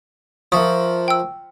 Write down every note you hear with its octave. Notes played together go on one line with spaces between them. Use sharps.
F3 A#4 E5 C#6 D#6
G5 E6